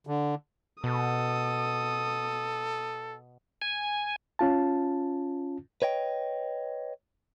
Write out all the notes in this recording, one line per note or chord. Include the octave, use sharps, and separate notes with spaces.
D3
B2 A4 D#6
G#5
C#4 F4 A5
B4 C#5 D#5 G5